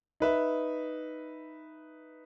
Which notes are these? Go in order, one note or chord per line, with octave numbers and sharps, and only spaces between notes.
D#4 B4 E5